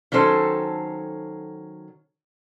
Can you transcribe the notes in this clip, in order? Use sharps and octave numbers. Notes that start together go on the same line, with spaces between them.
D#3 F#3 C#4 A4 C5